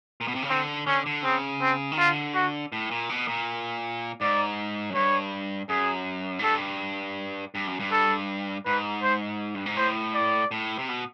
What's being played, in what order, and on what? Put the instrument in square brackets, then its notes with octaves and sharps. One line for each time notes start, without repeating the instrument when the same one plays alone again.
[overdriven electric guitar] A#2
B2
C3
C#3
[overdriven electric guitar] D3 [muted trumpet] C4
[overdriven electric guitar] D3 [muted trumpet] C#4
[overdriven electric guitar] D3
[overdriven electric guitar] C#3 [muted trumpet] C4
[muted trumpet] C4
[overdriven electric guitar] D#3
[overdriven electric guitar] D3 [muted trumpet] F4
[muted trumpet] F#4
[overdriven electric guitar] A2
A#2
B2
A#2
[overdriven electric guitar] G#2 [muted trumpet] D5
[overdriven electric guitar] F#2
[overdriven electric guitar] G2 [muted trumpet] C#5
[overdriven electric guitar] F#2 [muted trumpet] G#4
[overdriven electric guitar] G#2
[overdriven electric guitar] G2 [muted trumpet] A4
[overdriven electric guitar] G2
F#2
G2
[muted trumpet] A4
[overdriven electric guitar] G#2 [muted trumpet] B4
[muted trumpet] C5
[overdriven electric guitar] G2
G#2
[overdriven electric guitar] A2 [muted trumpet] C5
[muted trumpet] D5
[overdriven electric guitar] A2
C3
B2